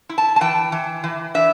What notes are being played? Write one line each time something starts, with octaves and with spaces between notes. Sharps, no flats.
E4
A5
A5
E3 G5
E3
E3
D4 E5